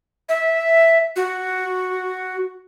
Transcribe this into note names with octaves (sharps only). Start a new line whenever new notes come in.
E5
F#4